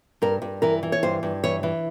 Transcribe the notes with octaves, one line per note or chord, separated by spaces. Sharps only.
G2 A#4
G2
E3 A#4
E3
C#5
G2 C5
G2
E3 C#5
E3